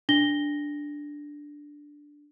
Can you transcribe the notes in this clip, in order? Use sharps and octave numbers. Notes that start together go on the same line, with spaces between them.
D4 A#6 G7